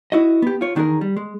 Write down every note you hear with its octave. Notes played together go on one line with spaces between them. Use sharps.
E4 F#4 D#5
B3 G4
F4 C#5
E2 D#3 D4 D#4 G#4 A#4
G3
G#3